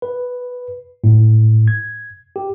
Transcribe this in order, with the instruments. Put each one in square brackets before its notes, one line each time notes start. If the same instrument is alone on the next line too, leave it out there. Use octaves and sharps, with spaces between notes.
[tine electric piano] B4
A2
G#6
G4